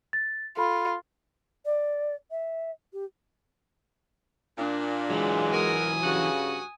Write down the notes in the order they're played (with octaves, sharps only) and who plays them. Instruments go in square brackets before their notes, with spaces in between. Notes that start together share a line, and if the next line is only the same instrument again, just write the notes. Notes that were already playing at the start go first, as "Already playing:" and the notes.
[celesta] A6
[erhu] F4 [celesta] A4 B5
[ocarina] D5
E5
G4
[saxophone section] A#2 [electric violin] D4
[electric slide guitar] E3 F#3 [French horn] G#3
[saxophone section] F#4 A#4 [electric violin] G#5 D#6
[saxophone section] G2 F#4 [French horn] C#3